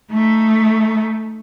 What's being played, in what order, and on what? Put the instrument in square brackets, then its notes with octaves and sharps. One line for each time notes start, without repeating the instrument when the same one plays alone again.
[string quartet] A3 D#4